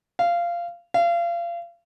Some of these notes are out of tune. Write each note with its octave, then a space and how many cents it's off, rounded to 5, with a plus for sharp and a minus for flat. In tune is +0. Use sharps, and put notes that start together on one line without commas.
F5 -15
F5 -30